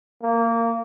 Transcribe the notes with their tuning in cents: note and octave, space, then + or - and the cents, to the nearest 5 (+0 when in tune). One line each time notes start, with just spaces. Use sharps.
A#3 -20